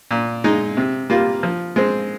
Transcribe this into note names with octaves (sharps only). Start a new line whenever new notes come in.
A#2
G#3 D#4
C3
G3 A#3 F4
F3
G#3 C4